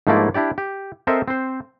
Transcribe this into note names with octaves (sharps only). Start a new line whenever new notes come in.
G#2 F3 A3 A#3 E4 D5
D4 E4 G4 D5
G4
C4 A4 A#4 C5 D#5 E5
C4 C5